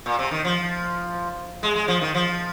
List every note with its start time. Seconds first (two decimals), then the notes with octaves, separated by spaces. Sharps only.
0.06 A#2
0.19 C3
0.31 D#3
0.45 F3
1.63 G#3
1.76 G#3
1.88 F3
2.01 D#3
2.15 F3